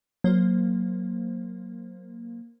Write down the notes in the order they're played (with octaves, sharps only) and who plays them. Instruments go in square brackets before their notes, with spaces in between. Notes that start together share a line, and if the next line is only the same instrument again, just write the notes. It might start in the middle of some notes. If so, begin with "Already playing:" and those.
[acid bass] F#3 [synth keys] A#3 C5